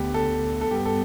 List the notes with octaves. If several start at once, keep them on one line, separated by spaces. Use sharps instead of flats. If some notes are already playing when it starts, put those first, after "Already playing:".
Already playing: D2 D3 A3 B3 G4
A4
A4
G2 G3 B3 G4
A4